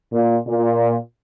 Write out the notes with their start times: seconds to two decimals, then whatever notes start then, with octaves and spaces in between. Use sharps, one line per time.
0.12 A#2
0.47 A#2